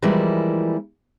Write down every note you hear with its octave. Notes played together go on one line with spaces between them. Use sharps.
E3 F3 G3 G#3 A#3 E4